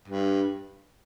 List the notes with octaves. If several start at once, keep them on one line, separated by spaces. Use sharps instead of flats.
G2